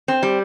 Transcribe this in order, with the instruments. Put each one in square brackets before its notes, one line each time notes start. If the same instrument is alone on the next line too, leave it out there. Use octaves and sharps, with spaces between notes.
[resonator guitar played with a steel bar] C4
G3